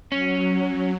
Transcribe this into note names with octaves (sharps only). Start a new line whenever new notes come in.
F#3 C#4